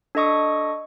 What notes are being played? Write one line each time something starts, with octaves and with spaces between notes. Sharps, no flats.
D4 A4 D#5 C#6 D#6